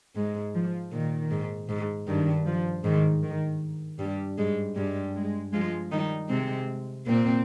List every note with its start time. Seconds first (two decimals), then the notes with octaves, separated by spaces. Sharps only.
0.16 G#2 G#3
0.55 F3
0.92 A#2 D#3
1.31 G#2
1.69 G#2
2.07 G2 D#3
2.46 F3
2.84 G#2 D#3
3.23 D#3
3.99 G2 G3
4.38 G#2 G3 G#3
4.76 G2 G3 G#3
5.15 G#3
5.52 F3 G#3 F4
5.91 D#3 G3 D#4
6.29 C3 G#3 C4
7.06 A#2 A#3 C4